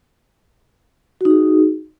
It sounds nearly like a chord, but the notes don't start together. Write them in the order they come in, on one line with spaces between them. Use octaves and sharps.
F#4 D#4 G#4